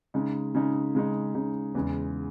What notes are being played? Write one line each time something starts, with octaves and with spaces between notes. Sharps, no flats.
C#3 G#3 D#4
C#3 G#3 D#4
C#3 G#3 D#4
C#3 G#3 D#4
E2 C#3 G#3